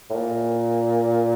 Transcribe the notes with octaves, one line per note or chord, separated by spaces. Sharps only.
A2
A#2